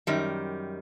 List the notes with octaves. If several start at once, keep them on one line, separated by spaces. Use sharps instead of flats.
F#2 D#3 G3